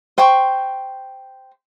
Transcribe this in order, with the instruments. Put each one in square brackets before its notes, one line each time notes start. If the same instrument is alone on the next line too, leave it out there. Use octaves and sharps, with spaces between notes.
[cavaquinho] C5 G5 C6 C#6